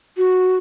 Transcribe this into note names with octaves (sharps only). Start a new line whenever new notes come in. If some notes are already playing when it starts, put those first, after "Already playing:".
F#4